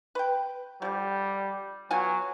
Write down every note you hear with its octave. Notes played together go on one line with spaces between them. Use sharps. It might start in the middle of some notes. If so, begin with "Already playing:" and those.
B4 G5
D3 F3 G3
B2 F#3 F4 G#5